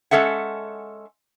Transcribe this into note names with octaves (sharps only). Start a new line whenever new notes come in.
G#3 C#4 A4 E5 F#5